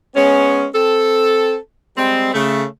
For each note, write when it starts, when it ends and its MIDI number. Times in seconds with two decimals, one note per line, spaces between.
0.16 0.65 56
0.16 0.65 59
0.16 0.65 61
0.75 1.56 60
0.75 1.56 69
1.97 2.30 55
1.97 2.30 56
1.97 2.30 60
2.33 2.63 49
2.33 2.63 57